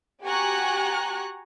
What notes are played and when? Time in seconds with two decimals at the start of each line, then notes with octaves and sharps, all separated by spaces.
0.23 F#4 G4 G#5 A#5 C#6 F#6